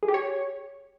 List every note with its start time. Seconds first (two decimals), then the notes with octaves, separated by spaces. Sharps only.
0.03 G#4
0.08 G4
0.14 C#5